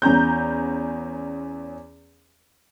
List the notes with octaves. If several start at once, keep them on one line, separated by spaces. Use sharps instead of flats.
E2 C#4 A#5 G6